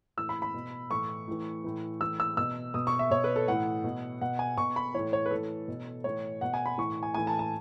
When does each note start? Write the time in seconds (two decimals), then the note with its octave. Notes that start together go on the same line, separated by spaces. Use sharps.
0.17 A2 E3 E6
0.29 B5
0.42 B5
0.54 B2
0.91 A2 E3 C#6
1.28 A2 E3
1.64 A2 E3
2.01 A2 E3 E6
2.20 E6
2.37 B2 E6
2.74 B2 D#6
2.87 C#6
2.99 E5
3.11 B2 C#5
3.24 B4
3.36 A4
3.48 A2 E3 F#5
3.84 B2
4.21 B2 F#5
4.39 G#5
4.58 B2 C#6
4.76 B5
4.94 A2 E3 C#5
5.13 C#5
5.26 B4
5.31 A2 E3 A4
5.68 B2
6.04 A2 E3 C#5
6.41 B2 F#5
6.54 G#5
6.66 B5
6.78 A2 E3 C#6
7.03 G#5
7.14 A2 E3 G#5
7.27 A5
7.39 A5